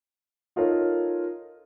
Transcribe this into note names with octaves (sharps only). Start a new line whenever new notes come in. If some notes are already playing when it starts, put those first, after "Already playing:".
D#4 F4 A4 A#4 C#5